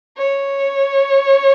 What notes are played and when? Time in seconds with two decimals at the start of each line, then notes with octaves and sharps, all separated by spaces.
0.17 C#5